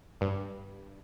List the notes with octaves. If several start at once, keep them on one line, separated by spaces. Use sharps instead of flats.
G2